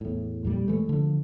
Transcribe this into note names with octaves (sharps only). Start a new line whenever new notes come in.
E2 A2
F2 A#2 G3
E3 G#3 A3
D3 F3